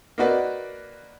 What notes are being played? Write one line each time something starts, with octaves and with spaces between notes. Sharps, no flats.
A#3 D#4 F#4 B4 D5